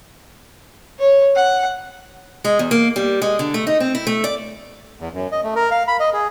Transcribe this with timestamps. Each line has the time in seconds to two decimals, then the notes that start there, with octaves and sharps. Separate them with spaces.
0.99 C#5
1.35 F#5
2.45 G#3
2.59 E2
2.71 A#3
2.96 G3
3.22 G#3
3.39 D3
3.54 A3
3.67 D#4
3.80 C4
3.95 E4
4.07 A3
4.24 D5
5.00 E2
5.14 F#2
5.32 D#5
5.43 A3
5.56 A#4
5.71 F5
5.88 B5
6.00 D#5
6.13 G#4